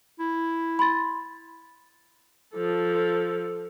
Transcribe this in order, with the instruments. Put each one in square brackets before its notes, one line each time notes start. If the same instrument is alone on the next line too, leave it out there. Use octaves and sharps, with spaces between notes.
[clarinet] E4
[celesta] B5 C6 A6
[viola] F3 A4